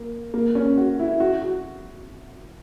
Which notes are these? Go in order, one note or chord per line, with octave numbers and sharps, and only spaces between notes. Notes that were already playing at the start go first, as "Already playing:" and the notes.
Already playing: A#3
A#3
C#4
F#4
E4
F#4
F#4